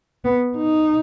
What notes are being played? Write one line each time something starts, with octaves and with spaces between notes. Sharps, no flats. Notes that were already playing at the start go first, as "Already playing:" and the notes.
B3
D#4